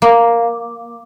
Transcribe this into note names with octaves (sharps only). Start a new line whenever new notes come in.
A#3